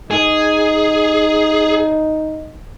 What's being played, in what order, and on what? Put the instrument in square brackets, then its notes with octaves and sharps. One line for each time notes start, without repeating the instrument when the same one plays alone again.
[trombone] D#4 [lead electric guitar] G#4